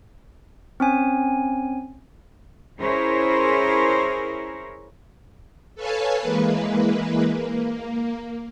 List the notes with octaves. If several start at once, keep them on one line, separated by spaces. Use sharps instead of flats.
C4 C#4 G#5
C#4 E4 G#4 A#4 C5 C#5
A4 B4 C#5 F5 G#5 A5
E3 G#3 A#3 B4
A#3